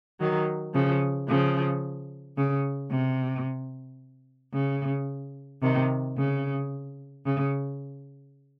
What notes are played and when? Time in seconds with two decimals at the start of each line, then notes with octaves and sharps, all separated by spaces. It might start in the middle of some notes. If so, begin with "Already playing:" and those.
0.20 D#3 F#3
0.74 C#3 F3
1.29 C#3 F3
2.37 C#3
2.91 C3
4.54 C#3
5.62 C3 D#3
6.17 C#3
7.25 C#3